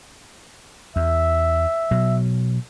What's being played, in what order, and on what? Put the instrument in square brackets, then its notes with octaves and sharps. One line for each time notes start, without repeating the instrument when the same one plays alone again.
[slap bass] E2 [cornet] E5
[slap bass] B2 F#3